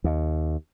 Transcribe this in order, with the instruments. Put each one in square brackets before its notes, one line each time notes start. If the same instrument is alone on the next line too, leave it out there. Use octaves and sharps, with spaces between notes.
[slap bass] D#2